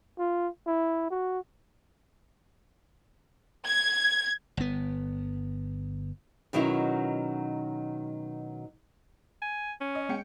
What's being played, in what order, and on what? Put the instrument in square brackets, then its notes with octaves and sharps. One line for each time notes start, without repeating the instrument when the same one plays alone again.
[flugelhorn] F4
E4
F#4
[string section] G#6
[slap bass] G1 B3
[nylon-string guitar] B2 D#3 F#3 C#4 E4
[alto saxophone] G#5
C#4
[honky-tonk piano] D#5
G#3 G5 C#7